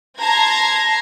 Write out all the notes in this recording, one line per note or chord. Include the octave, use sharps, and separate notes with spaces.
A5 A#5 C6 G#6 A#6